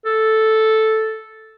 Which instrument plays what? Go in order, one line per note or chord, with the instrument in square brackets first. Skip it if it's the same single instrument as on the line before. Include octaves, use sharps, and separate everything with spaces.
[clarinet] A4